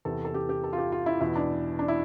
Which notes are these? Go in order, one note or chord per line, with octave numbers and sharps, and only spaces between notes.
E2 C3 E3 A4
A4
G4
G4
A4
F4
G4
F4
E4
E2 B2 E4
D4
D4
E4